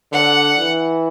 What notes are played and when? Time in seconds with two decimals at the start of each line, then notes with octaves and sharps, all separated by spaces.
0.12 D3 F#5
0.58 E3